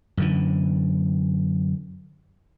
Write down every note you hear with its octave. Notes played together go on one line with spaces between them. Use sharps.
F#2 D3 E3